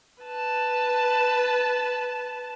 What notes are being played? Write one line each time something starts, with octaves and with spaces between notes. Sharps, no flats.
B4 A5